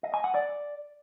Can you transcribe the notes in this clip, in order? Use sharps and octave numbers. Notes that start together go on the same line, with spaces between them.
D#5
G#5
F#5
D5